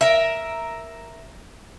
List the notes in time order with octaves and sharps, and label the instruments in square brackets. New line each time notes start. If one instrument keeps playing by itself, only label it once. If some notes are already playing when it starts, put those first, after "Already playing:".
[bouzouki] A#4 E5